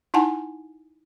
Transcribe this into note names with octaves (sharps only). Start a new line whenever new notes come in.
D#4 E4 F#5 G#5 A5